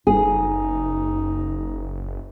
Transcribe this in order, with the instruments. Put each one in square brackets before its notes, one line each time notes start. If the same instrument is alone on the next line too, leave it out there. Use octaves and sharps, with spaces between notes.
[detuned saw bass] F#1 [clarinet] D#4 [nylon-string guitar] G#4